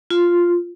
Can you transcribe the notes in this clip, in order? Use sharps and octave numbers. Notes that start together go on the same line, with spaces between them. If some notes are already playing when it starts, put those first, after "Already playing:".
F4